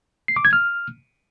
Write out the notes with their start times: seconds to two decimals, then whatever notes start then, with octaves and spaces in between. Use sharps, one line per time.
0.28 C7
0.36 D6
0.45 G#6
0.53 F6